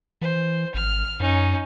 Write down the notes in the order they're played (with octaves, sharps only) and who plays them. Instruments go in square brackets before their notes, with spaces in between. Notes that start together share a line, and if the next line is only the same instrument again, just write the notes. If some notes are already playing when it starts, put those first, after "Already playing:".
[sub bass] E3 [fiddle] C5
[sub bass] G#1 [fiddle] F6
[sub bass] F#2 [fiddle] C#4 D#4